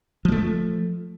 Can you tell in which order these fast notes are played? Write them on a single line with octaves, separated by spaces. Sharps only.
F3 G#3 A3